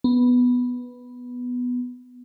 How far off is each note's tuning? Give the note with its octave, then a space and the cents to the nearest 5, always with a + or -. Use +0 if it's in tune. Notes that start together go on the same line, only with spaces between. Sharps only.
B3 +0